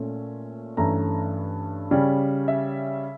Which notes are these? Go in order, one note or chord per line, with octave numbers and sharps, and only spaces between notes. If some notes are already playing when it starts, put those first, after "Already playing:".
Already playing: A#2 A3 C#4
G2 E3 A3 C#4 A#5
C#3 G3 C#4
E5